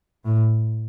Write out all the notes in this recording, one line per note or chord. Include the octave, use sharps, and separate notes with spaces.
A2